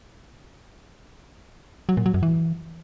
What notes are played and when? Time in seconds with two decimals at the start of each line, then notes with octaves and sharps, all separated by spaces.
1.89 F#3
1.97 A#2
2.06 F#3
2.14 F#2
2.23 E3